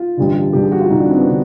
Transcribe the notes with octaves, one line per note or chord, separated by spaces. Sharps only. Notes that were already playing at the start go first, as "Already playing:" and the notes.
Already playing: F4
A1 G2 D3
A1 G2 D3 G4
G#4
F#4
F4
A1 G2 D3 D#4
D4
C4
B3
D3 C4